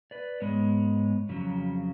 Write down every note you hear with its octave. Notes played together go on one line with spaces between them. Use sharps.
B4 D5
G#2 G#3 B3 C#5
F2 C#3 F#3